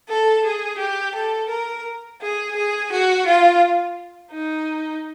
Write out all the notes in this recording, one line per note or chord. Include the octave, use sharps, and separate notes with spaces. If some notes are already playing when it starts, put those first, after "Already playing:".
A4
G#4
G4
A4
A#4
G#4
G#4
F#4
F4
D#4